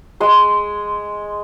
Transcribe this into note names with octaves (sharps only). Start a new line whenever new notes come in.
G#3 C6